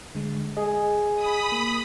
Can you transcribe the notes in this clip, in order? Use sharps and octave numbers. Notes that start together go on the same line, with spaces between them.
D3 G#3
G#4 D#5
B5 D#6
A#3